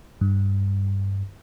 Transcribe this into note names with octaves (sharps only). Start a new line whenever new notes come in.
G2